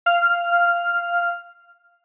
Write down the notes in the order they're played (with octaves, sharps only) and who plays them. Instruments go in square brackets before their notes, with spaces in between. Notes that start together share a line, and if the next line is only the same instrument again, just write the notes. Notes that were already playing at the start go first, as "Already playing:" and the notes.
[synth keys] F5 F6